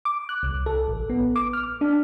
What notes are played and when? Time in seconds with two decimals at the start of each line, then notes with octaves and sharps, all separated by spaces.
0.05 D6
0.29 F#6
0.43 C2
0.66 A4
0.88 A1
1.10 B3
1.36 D6
1.53 F6
1.81 D4